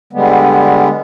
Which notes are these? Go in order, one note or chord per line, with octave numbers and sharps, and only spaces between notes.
D3 G3 G#3 B3